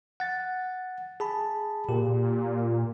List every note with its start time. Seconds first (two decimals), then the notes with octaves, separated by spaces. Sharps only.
0.20 F#5 A6
1.20 G#4 A5 B5
1.89 A#2 G4